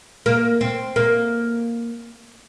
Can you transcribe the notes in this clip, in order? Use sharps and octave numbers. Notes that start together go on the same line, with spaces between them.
A#3
C4
A#3